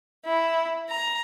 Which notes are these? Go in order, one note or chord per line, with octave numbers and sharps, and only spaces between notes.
E4
A#5